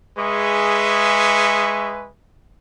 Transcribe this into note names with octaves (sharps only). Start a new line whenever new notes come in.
G#3 G#4 B4 E5 C#6